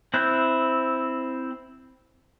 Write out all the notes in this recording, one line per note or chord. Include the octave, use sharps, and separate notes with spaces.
C4 E4 F#6 G6